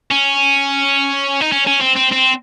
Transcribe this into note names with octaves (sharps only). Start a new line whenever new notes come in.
C#4
D#4
C#4
C#4
C4
C4
C4